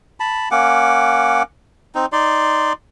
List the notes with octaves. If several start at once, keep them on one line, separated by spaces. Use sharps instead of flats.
A5 B5
A#3 C#4 F#5 D6
C4 D#4
D#4 D5 C6